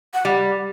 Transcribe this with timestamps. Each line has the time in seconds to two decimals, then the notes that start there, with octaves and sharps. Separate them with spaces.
0.14 F#5
0.25 G3